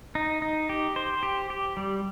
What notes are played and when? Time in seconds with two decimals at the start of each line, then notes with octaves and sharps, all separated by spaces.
0.15 D#4
0.42 D#4
0.69 G4
0.96 C5
1.23 G4
1.50 G4
1.77 G3